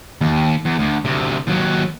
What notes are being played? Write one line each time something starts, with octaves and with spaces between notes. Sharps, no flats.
D#2
E2
D2
D2 C3
D#2 F#3